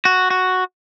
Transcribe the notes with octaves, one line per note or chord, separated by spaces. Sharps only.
F#4
F#4